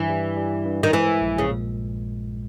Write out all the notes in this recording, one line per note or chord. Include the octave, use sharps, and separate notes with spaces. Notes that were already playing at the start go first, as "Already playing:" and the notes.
Already playing: G2 E3
G3
G3
G2
D#3
E3 G#3
A#1
C#3
A#2